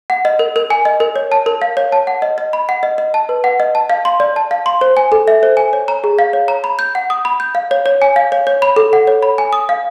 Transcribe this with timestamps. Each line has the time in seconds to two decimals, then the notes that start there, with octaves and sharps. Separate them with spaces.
0.10 F#5
0.25 D#5
0.39 A#4
0.56 A#4
0.70 G#5
0.85 D#5
1.00 A#4
1.16 C#5
1.32 A5
1.46 A#4
1.62 F5
1.77 C#5
1.92 A5
2.07 F#5
2.22 D#5
2.38 D#5
2.53 B5
2.69 F#5
2.83 D#5
2.98 D#5
3.14 A5
3.29 B4
3.44 F#5
3.60 D#5
3.75 A5
3.90 F5
4.05 C6
4.20 D5
4.36 A5
4.51 F5
4.66 C6
4.81 C5
4.97 G#5
5.12 A4
5.28 E5
5.43 C5
5.57 G#5
5.73 C#5
5.88 A#5
6.04 G#4
6.19 F5
6.33 C#5
6.48 A#5
6.64 B5
6.79 G6
6.95 F#5
7.10 D#6
7.25 B5
7.40 G6
7.55 F5
7.71 C#5
7.86 C#5
8.02 G#5
8.16 F5
8.32 C#5
8.47 C#5
8.62 B5
8.76 A4
8.93 F#5
9.07 C#5
9.23 B5
9.38 G#5
9.53 D#6
9.69 F5